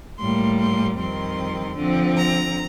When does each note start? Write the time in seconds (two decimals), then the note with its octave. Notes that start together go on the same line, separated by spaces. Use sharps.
0.19 A2 G3 A#3 C6
0.59 C6
0.98 F2 D#3 G3 C4 C6
1.77 D3 F3 C4
2.17 A#5